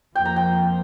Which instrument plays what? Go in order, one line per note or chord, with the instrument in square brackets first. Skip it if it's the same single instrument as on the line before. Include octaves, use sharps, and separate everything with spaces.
[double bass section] F2 F3 A#3 [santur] G5
[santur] A#5
G5